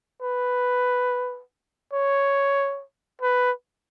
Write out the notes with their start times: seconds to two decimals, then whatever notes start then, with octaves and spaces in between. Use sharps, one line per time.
0.22 B4
1.93 C#5
3.21 B4